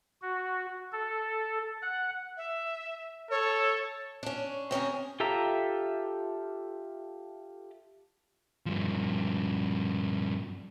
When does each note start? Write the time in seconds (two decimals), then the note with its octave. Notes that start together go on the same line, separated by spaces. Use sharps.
0.22 F#4
0.93 A4
1.82 F#5
2.37 E5
3.31 A4 C#5
4.23 C#4 D4
4.71 C4 C#4 G#4 A#4
5.20 F4 G4 A4 E5 A#5
8.66 G2 F3